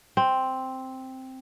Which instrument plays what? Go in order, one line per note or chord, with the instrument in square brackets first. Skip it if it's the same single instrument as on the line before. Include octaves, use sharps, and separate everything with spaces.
[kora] C4